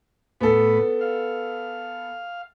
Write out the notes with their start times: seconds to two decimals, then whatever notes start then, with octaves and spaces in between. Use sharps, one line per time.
0.41 A2 B3 A4 B4
1.01 F5